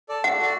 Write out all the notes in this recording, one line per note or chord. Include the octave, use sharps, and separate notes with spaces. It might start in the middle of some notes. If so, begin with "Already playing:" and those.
A4 D5 A5
A3 F#5
F#4 A4 D5